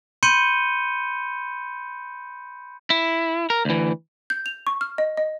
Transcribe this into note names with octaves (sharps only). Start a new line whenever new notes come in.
B5 C6 G6 C#7 D#7 G7
E4
A#4
D2 E3
G6
F7
C#6
F6
D#5
D#5